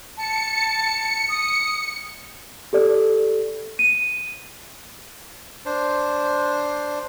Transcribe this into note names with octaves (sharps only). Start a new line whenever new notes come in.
A5 C#7
D#6
G4 A4 D5
D#7
D4 C5